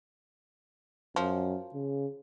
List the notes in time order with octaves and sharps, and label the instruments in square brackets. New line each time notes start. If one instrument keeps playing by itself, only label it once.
[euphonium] F#2 [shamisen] F3
[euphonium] C#3